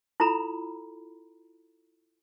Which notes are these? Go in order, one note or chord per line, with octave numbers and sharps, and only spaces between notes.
E4 F4 A4 A#5 B5